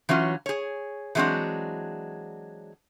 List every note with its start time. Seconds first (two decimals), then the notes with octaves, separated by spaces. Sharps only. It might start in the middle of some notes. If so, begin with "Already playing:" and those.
0.09 E3 F#3 C#4 F4
0.46 G#4 C#5
1.15 E3 F#3 G#3 C4 D4 F#4